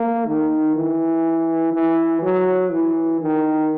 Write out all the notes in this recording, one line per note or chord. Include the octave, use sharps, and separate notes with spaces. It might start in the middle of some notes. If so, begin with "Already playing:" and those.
Already playing: A#3
D#3
E3
E3
F#3
E3
D#3